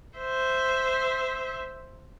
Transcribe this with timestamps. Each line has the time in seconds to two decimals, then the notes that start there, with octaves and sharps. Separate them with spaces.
0.18 C5 E5